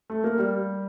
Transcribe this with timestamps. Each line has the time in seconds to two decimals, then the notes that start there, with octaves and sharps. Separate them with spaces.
0.10 A3
0.24 A#3
0.39 G3